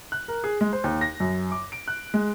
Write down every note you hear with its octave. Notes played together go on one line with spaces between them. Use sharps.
F#6
A#4
G#4
G#3
C5
D#2
A#6
F#2
D6
D7
F#6
G#3